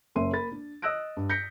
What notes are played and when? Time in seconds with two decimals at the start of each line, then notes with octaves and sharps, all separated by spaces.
0.15 F#1 A#3 C#4 E5 C6 D#7
0.33 A#3 B5 A6
0.52 D4
0.82 D#5 D#6 E6 F#6 A#6 D7
1.17 G2
1.30 G6 A#6 B6 C#7